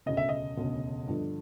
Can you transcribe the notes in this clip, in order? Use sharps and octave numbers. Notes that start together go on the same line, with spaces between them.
E1 D2 C#3 D#5
E5
D#5
E1 D2 C#3
G2 D3 F3